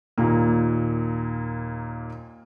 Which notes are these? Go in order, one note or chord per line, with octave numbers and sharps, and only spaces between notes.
D#2 A#2 A#3